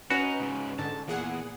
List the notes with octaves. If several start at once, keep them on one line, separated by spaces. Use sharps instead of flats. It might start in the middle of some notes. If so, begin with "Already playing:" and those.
C#4 D#4 F#4 B4
G#2 C#3
G#2 D3 A5
E2 A#2 G#4 F#5